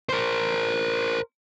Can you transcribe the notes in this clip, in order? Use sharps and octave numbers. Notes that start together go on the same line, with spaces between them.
A#4 C5